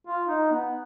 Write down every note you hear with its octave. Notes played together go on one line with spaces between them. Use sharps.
F4
D#4
B3